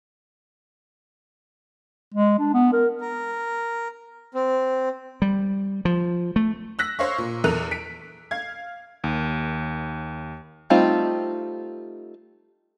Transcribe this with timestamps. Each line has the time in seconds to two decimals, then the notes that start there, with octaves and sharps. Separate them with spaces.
2.14 G#3
2.39 D4
2.54 B3
2.73 A#4
3.01 A#4
4.35 C4
5.22 G3
5.85 F3
6.36 A3
6.79 E6 F#6 A#6 B6
6.99 C5 C#5 F5 C#6
7.18 A#2
7.44 E2 A4 A#4 F#6 D#7 F7
7.71 B6 D7
8.31 F5 G#6
9.04 D#2
10.70 G3 A3 C4 D#4 F4